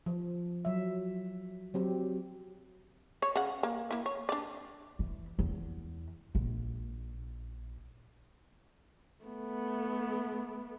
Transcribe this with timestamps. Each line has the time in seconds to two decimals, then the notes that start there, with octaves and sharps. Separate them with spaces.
0.06 F3
0.65 F#3 E5
1.74 F#3 C4 G4
3.22 C#5
3.36 C#3 F#5
3.63 A#3
3.91 A#3 E4
4.06 C#5
4.29 D4 D5
4.99 E3
5.39 E2
6.35 A#1
9.25 A3 B3